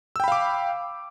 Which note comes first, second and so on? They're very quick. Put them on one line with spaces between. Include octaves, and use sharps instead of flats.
E6 G5 B5 F5 D6